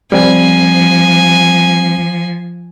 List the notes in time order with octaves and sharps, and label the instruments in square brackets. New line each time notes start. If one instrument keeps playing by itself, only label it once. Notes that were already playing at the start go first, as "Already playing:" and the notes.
[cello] F3 [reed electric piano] G3 C4 [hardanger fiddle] G#5